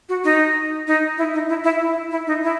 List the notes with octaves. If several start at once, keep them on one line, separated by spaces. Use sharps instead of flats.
F#4
D#4
D#4
E4
D#4
E4
E4
E4
E4
D#4
E4